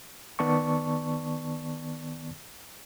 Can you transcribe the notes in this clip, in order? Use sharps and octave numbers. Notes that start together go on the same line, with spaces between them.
D#3 B3 D5 A5 C#6